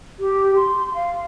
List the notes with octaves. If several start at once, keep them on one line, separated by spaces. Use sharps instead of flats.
G4
C6
F5